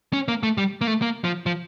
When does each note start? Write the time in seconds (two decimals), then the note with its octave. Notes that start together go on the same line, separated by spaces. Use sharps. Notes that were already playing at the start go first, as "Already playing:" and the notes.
0.13 C#4
0.28 A#3
0.43 A3
0.58 G3
0.81 A#3
0.87 A3
1.02 A#3
1.24 F3
1.46 F3